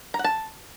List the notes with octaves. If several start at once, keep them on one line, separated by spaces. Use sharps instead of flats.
A#5
F#5
A5